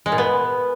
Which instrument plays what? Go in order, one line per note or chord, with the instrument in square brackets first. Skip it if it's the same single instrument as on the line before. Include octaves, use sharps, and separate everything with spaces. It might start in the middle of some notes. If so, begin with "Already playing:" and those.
[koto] G#3
A#2
B3